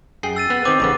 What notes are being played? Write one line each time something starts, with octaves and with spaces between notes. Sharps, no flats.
F#2 G#4 G5 C7
E6 A6 D#7
B3
D#3 C4 D6
A1 C#3 B3